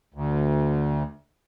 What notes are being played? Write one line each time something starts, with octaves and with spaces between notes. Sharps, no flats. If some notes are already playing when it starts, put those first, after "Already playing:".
D2